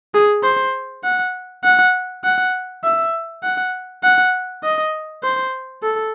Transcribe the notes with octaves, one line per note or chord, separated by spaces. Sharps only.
G#4
C5
F#5
F#5
F#5
E5
F#5
F#5
D#5
C5
A4